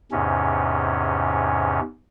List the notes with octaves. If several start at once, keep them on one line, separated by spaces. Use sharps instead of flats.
E2 G#2 C3 C#4